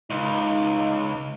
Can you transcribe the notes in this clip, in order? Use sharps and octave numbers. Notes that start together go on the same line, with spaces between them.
C#2 D#4